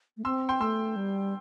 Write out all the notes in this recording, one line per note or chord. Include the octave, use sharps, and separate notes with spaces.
A3
C4 C6 E6
G5 C6
A3 C6 E6
G3